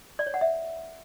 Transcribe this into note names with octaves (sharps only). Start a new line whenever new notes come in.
D5
C#5
F#5
E5